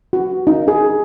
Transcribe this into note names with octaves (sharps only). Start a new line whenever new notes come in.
F#4
D#4
G#4